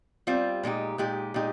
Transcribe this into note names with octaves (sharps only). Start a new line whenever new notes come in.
G3 C4 F4
A#2 G#3 D#4 G4
A#2 G#3 D#4 G4
A#2 G#3 D#4 G4